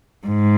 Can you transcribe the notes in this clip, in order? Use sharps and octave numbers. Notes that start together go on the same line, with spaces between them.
G#2